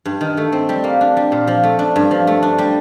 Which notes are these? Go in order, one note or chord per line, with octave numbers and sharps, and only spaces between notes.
G2
D#3
A3
C4
G3
A#3
D4
G3
A#2
F3
A3
D4
G2
F3
A3
D4
G3